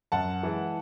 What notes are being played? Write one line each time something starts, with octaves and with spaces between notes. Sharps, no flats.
F#2 F#5 A5
E3 G#3